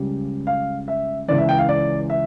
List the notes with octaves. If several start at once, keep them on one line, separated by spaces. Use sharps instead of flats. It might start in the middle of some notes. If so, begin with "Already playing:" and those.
Already playing: C#2 C#3 G3
F5
E5
C#2 C#3 E3 D5
E5
G5
F5
D5
E5